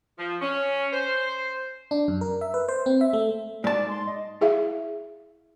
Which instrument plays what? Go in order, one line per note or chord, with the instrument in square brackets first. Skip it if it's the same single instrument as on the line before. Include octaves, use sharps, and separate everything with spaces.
[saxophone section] F3
C#4
C5
[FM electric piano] D4
F#2
A#4
E5
B4
C5
C4
E5
A3
[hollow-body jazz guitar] G#2 A5 [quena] D5
[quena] C6
D#5
[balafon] E4 G#4 E5 F5